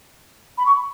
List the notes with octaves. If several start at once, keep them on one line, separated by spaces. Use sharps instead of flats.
B5
C#6